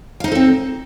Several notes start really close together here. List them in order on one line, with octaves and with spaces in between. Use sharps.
F5 D#4 C5 A4 C4